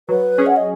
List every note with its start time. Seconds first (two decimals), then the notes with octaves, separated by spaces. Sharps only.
0.09 F#3 B4
0.38 C#4 G#4
0.46 F#5
0.56 D#5